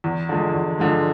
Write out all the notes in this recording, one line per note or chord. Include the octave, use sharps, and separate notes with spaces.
E2
D3 F3 G#3
E2
D3 F3 G#3